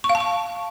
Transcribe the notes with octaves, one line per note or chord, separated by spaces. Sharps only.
C#6
F5
A5
C#6